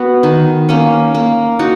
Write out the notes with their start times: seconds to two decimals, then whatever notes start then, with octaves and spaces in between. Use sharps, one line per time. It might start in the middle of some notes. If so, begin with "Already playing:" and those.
Already playing: B3 F#4
0.23 D#3
0.69 A#3 C#4
1.14 A#3
1.59 D#4 F#4